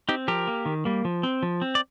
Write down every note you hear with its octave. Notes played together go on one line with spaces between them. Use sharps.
C4 D#4 G4
F3 G4 A#4
A#3
D#3
G3 A#3
F3
C4
F3
C4
D5